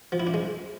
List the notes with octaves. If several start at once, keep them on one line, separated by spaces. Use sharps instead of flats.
F3
E4
D4
G#3